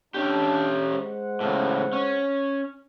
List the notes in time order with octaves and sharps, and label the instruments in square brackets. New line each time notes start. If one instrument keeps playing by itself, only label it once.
[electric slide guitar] C#4 G4 [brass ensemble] D4
[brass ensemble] G#3 C5 F#5
[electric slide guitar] A2 C#3
C#4